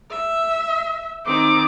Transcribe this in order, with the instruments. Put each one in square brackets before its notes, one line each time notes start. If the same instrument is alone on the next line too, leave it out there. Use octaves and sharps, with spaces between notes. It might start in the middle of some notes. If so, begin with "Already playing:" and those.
[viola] E5
[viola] D#3 C4 [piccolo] D6